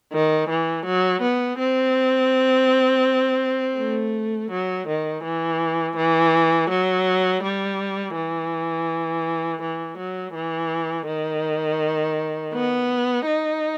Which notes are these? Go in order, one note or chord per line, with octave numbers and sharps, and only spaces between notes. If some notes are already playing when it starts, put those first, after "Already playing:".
D#3
E3
F#3
B3
C4
A3
F#3
D#3
E3
E3
F#3
G3
E3
E3
F#3
E3
D#3
B3
D#4